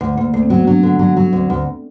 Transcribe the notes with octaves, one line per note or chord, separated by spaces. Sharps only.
D2 A3
D2 A#3
D2 A3
C4
F#3 B3
F#3 D4
D3
F#3
F#3
D2 C4
D2